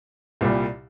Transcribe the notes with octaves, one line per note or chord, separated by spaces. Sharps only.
C2 A#2 G3